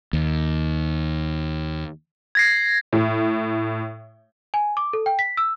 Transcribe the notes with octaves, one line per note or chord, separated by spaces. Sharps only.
D#2
G#6 A#6 C7
A2
G#5
D6
A4
G5
B6
E6